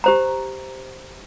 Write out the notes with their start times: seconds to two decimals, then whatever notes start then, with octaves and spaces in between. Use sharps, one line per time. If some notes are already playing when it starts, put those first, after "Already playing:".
0.04 G4 C5 A#5